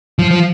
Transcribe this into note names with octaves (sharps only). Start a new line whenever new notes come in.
F3
F3